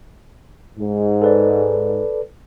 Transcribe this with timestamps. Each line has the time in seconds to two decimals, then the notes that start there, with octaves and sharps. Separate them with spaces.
0.77 G#2
1.22 A4 B4 D5